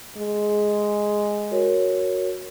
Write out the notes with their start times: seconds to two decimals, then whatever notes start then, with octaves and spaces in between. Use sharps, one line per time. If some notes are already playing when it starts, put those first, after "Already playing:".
0.17 G#3
1.51 F#4 A#4 C#5